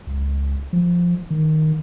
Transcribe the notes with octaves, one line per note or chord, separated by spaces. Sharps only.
C#2
F3
D#3